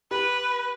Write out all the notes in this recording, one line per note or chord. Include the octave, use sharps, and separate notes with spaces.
G4 B4